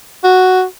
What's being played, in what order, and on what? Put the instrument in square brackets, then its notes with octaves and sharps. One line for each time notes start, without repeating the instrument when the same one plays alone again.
[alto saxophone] F#4